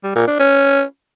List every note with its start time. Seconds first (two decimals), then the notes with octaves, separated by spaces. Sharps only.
0.04 G3
0.15 A#2
0.27 D4
0.39 C#4